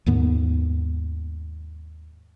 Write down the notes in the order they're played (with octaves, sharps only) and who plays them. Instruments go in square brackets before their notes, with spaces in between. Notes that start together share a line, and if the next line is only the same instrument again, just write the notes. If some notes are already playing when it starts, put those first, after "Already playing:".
[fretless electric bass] D#2 G#2 D#3 B3